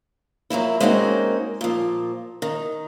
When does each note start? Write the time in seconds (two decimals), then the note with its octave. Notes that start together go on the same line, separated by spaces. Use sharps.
0.50 F2 F#3 A#3 E4
0.80 G#3 A#3 C4 C#4 D#4 F#4
1.61 A#2 F3
2.42 D#3